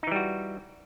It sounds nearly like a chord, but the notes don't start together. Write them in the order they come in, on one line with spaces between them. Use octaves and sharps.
D#4 E3 G3 F#4